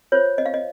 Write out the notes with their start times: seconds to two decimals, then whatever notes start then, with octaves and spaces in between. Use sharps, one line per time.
0.12 F4 C5 C#5
0.38 D#5
0.46 F5
0.54 D#5